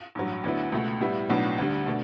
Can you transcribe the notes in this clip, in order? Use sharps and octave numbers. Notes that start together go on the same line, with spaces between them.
A1 G2 F#3
D2 D3 F#3 B3 E4
C#2 B2 A3
A2 G3 B3 E4
B1 A2 F#3 B3 D4
D2 D3 G3
B2 A3 D4